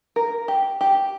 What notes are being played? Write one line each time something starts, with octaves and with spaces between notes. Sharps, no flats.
A#4
G4
G4